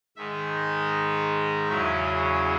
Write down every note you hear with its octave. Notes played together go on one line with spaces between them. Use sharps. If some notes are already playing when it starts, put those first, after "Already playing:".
G#2 D#3 G#3 D#4 E5
D#5
E2 C#3 F#3 C#4 E4 E5